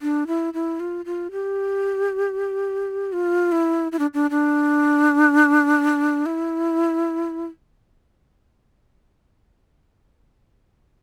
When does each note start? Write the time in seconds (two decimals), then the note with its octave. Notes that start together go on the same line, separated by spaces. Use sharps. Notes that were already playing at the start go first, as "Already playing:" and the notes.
0.02 D4
0.27 E4
0.54 E4
0.80 F4
1.05 F4
1.31 G4
3.13 F4
3.52 E4
3.92 E4
3.99 D4
4.14 D4
4.31 D4
6.26 E4